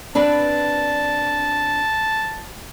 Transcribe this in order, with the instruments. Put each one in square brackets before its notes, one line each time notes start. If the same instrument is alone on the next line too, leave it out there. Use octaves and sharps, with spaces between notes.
[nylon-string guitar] C4 D4 B4 [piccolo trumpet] A5